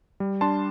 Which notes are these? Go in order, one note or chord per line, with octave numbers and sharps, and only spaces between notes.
G3
D4 A5 C6